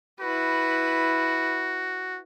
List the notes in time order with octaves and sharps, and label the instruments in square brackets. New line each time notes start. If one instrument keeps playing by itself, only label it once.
[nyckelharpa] E4 B4 [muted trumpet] F#4